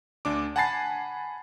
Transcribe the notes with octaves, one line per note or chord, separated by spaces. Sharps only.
D2 D4 D6
F#5 G#5 A5 B5 A6 C7